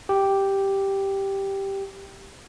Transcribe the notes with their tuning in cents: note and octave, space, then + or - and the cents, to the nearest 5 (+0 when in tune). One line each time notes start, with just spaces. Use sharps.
G4 +0